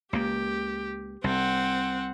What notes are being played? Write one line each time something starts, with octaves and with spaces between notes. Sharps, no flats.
C#2 C#3 A#3 G4
C2 C4 F#5